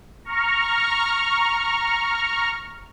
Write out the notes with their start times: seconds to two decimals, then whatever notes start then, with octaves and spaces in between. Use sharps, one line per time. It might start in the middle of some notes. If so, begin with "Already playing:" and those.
0.25 A#5 C#6 F6